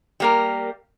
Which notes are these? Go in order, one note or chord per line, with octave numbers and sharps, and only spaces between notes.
G3 A#3 A#4